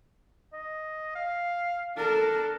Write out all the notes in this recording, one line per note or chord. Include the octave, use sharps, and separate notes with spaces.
D#5
F5
D4 A4 A#4